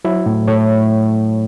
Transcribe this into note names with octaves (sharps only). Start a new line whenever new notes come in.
F#3 E4
A2
A2 C#5